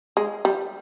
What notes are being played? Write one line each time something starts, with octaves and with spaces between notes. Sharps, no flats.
G#3
G3